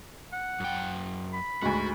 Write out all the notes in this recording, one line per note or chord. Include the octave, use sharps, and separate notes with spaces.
F#5
F#2 G5
B5
D2 G#2 F#4